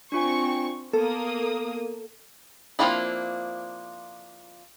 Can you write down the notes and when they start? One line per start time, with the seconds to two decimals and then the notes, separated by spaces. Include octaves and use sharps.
0.12 C4 D4 F4 G#5 C#6
0.93 A#3 B3 A4 D#6
2.79 F3 A#3 C4 D4 E4